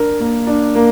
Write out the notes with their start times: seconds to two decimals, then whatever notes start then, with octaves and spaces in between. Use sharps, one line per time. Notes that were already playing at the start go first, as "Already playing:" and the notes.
Already playing: D4 A#4
0.20 A#3
0.47 D4
0.75 A#3